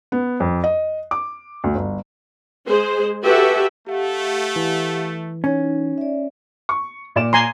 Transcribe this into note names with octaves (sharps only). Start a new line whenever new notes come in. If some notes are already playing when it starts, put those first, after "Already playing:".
B3
F2
D#5
D6
D2
G1
G#3 G#4 C5
F#4 G4 A4 B4 E5
A3 G4 F5 F#5
E3
C#4 D#4
D5 E5
C#6
A#2 D5 E7
G#5 A#5 C6